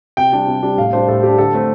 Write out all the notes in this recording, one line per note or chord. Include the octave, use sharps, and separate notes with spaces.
C3 G5
G3 D4
C3
G3 D4
A2 F5
G3 D4 C5
A2 A4
G3 D4 G4
D3 A4
A3 C4